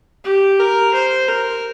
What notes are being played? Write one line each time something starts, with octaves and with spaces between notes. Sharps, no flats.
G4
A#4
C5
A#4